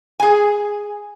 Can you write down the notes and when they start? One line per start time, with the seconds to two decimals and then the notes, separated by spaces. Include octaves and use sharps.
0.20 G#4 G#5